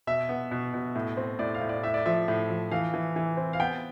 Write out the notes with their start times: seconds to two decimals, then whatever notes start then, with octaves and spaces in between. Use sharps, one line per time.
0.07 B2 E5
0.29 B3
0.51 B2
0.74 B2
0.96 A2
1.17 C4
1.39 A2 D5
1.54 F5
1.61 A2
1.69 D5
1.83 A2 E5
1.94 D5
2.06 F3 E5
2.28 A2
2.50 F3
2.71 E3 F5
2.94 E3
3.16 E3
3.37 C4
3.53 F5
3.60 B3 G5